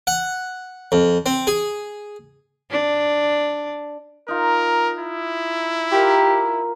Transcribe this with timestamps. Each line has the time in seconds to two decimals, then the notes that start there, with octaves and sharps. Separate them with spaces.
0.07 F#5
0.92 F2
1.26 C4
1.47 G#4
2.70 D4
4.28 D#4 F4 A#4
4.99 E4
5.92 F4 G4 A#4 G5